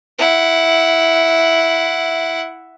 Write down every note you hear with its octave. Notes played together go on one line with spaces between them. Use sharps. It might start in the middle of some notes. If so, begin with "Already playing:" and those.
E4 F#5